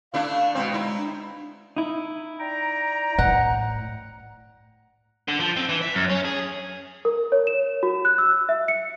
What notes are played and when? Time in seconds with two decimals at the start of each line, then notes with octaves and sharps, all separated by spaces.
0.14 A3 D4 E4 F5
0.55 B2 G#3 C4
0.72 D#4 E4
0.97 D4
1.76 D#4 E4
2.39 D5 G5 A#5
3.18 A2 F#5
5.28 D3
5.40 F3
5.56 C4
5.69 E3
5.82 E5
5.94 F#2
6.10 C#4
6.25 G#4
7.05 A#4
7.32 C#5
7.47 E7
7.83 F#4
8.05 F#6
8.18 E6
8.49 E5
8.68 C#7